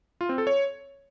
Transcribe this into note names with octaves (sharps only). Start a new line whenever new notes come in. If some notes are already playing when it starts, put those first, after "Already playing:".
F4
C4
A4
C#5